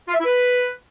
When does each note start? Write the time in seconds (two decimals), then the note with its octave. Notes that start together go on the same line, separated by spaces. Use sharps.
0.08 F4
0.14 E5
0.19 E4
0.25 B4